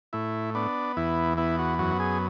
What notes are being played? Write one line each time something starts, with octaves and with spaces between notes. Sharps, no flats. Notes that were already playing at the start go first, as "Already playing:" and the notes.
A2 E4
B3 D4
E2 E4
B3 E4
F#4
F#2 F#4
G#4